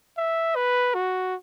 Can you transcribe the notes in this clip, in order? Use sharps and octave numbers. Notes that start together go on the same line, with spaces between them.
E5
B4
F#4